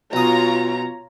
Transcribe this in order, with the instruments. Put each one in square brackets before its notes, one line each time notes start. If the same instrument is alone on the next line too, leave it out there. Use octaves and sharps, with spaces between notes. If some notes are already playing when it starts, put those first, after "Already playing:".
[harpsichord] B1 D#6 [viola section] F4 C#5 A#5